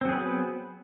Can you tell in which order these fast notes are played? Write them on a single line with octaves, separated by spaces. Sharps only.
C4 F#3 G#4 B4 B3